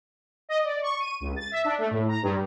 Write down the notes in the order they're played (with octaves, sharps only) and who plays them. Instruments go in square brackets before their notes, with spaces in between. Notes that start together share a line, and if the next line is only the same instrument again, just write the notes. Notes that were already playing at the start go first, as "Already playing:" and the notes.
[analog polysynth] D#5
D5
C#6
D#7
C#2
A6
E5
D4
A3
A2
A#5
G2